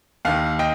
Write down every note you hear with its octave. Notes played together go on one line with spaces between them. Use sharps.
D#2 D#3 F5
D#5 G5